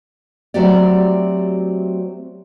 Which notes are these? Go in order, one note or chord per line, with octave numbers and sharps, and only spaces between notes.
F#3 A3 C4 F#4 G4 D5